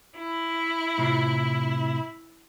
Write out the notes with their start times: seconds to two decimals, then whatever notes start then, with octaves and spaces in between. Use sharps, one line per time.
0.16 E4
0.98 A2 C3 F4